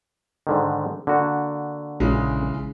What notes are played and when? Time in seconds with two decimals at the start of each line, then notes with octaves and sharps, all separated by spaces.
0.47 G#2 D3 D#3
1.07 D3 A#3 F#4
2.00 A#1 C#3 E3 G#3